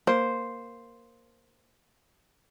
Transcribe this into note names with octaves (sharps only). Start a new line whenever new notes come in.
A#3 C5